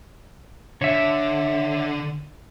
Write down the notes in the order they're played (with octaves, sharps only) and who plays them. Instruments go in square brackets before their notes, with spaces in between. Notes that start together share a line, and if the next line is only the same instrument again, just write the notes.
[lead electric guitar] D3 [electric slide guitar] C#5 E5